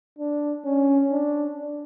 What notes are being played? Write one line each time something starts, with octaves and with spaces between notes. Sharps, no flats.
D4
C#4
D4